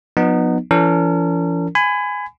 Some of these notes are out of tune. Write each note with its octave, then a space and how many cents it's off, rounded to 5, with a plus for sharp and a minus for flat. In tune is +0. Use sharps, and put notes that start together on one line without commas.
F3 +45 B3 +0 D#4 -25
E3 +45 C#4 +45 A#4 -40
G#5 +0 B5 +30